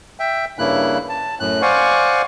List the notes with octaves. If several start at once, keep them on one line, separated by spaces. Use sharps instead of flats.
E5 G5
G2 C#3 A#3 E4 F#6
A5
F#2 A2 F#6
C5 D5 F5 F#5 G#5 C#6